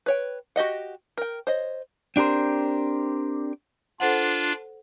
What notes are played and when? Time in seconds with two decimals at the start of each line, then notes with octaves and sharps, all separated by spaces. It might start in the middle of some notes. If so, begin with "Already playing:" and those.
0.06 B4 C#5 G5
0.56 F#4 G4 D#5 F#5
1.17 A#4 G5
1.47 C5 C#5 D#5
2.16 C4 D4 G4 A#4 C5
4.00 D4 F4 A4 C5 F#5